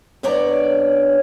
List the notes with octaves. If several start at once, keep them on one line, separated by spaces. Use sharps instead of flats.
F#2 B3 D4 C#5 D5 A#5